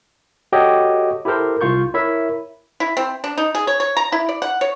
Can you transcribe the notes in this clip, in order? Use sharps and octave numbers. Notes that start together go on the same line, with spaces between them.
F#4 G4 A4 C#5 D#5 G5
E4 G4 A4 A#4 C5
C2 F4 C#6 G6
E4 A#4 C#5 E5
E4
C4
D4
D#4
G#4
C#5
C#5
A#5
E4
D5
F#5
C#5